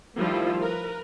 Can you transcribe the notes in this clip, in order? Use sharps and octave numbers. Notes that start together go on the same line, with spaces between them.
D#3 F3 G3 A3 E4 F4
A#4 B4